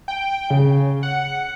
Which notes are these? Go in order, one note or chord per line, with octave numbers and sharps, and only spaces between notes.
G5
C#3
F#5